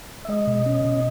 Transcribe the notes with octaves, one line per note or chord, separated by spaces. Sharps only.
E5
G#3 D#5
B2
C#4
B2